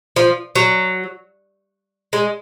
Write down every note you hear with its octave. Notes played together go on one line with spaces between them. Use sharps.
F3
F#3
G#3